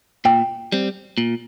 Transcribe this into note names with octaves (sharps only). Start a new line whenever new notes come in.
A#2 G5
G3 C4
A#2